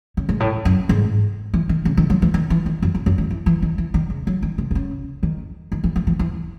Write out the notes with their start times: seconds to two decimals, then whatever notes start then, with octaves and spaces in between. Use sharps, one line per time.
0.17 C#3
0.29 G#2
0.40 A2
0.65 F#2
0.89 G#2
1.54 E3
1.69 D#3
1.85 C#3
1.97 D#3
2.10 F#3
2.22 E3
2.34 D#3
2.50 E3
2.66 D#3
2.82 F#2
2.95 E2
3.06 F#2
3.18 D#3
3.30 E3
3.46 E3
3.62 D#3
3.78 E3
3.94 D#3
4.10 C#3
4.27 F#3
4.42 D#3
4.58 C3
4.71 C3
4.75 C#3
5.23 D#3
5.72 D#3
5.84 E3
5.96 E3
6.07 E3
6.19 E3